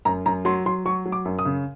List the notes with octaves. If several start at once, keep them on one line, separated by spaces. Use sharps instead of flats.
F#2 A#5
F#2 A#5
F#3 C6
F#3 C6
F#3 C#6
F#3
D6
F#2
D#6
C#3